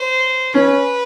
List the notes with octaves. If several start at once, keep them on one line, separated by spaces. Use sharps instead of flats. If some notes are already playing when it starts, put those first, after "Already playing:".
Already playing: C5
C#4 B4